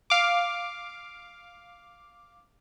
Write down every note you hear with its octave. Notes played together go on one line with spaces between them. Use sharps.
F5 D6